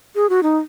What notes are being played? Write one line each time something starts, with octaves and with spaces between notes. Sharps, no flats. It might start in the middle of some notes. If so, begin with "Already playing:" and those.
G#4
F#4
D#4